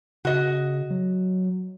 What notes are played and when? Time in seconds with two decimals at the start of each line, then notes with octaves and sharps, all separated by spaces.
0.25 C#3 F#4 D#5
0.90 F#3